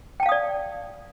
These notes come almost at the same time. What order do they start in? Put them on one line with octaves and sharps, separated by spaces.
G5 A5 F5 D#6 D5